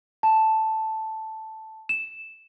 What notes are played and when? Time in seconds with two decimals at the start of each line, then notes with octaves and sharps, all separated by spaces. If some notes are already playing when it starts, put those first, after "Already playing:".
0.23 A5
1.89 E7